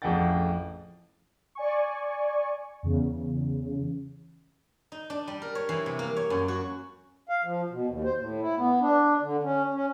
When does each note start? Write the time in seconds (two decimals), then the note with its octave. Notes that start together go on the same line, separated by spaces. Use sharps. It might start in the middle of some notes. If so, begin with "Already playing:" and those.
0.02 A1 F2 C#3 F#5 G5 A6
1.55 D5 G#5 C#6
2.83 E2 C#3
4.92 D#4
5.10 D4
5.27 G3
5.42 A#4
5.55 C#5
5.69 E3
5.86 C3
5.99 A#3
6.17 C#5
6.30 F#2
6.48 F#4
7.29 F5
7.44 F3
7.70 B2
7.86 D#2
8.04 C5
8.17 A2
8.41 E4
8.57 B3
8.81 D4
9.22 D3
9.43 C#4
9.74 C#4